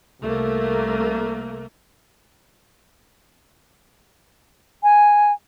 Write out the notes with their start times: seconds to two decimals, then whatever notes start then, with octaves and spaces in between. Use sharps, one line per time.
0.22 C2 A3 A#3
4.83 G#5